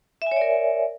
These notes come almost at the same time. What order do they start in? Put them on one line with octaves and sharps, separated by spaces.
E5 G#5 C#5 D5 A#4